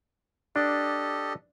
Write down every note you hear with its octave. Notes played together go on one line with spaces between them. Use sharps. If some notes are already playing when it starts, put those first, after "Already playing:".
D4 G4 A4 D#5